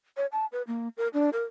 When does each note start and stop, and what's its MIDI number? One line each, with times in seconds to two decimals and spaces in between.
0.17 0.26 73
0.32 0.46 81
0.52 0.62 71
0.67 0.88 58
0.97 1.08 70
1.14 1.30 62
1.33 1.43 70